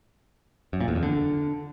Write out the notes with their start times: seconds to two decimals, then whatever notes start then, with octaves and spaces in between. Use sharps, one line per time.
0.73 F#2
0.81 A#2
0.88 E2
0.95 F2
1.03 D3